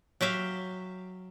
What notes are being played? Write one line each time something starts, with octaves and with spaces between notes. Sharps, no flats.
F#3 G4 E5 F5